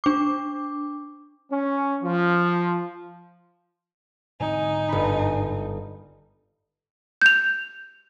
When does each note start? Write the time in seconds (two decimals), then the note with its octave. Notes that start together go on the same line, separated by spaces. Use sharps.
0.04 D4 D6
1.52 C#4
2.03 F3
4.40 G#2 D3 C4 D#4 G#5
4.89 G1 B5
7.22 G6 F7